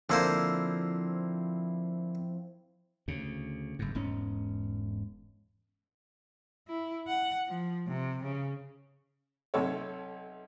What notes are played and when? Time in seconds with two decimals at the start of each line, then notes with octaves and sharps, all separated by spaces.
0.10 D3 F3 A#3 C4 E4 C5
3.08 D2 C#3
3.79 F#1 G#2
3.95 E1 G#2 C#4
6.67 E4
7.07 F#5
7.48 F3
7.87 C3
8.24 C#3
9.54 B1 C3 A4 C#5